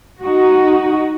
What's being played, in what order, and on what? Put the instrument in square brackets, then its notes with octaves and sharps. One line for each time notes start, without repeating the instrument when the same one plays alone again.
[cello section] D#4 F#4